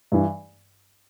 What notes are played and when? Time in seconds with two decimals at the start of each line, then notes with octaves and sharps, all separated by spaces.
0.12 G2 E3